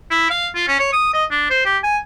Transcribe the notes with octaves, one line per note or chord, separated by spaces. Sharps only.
E4
F5
F4
C#4
C#5
D#6
D#5
D4
C5
G4
G#5